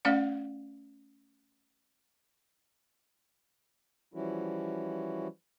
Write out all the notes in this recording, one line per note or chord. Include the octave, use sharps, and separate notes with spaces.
A3 C#4 D5 F5 F#5
E3 F3 G3 C#4 E4 F#4